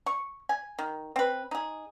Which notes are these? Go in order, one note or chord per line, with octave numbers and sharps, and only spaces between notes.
C#6
G#5
D#3
C4 B4
D#4 G#4